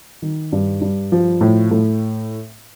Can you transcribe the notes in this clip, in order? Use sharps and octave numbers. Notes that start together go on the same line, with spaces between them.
D#3
G2
G2
F3
A2
A2